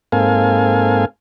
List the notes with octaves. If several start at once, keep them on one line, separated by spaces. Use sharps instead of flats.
G#2 A#3 C4 A4 F5 G#5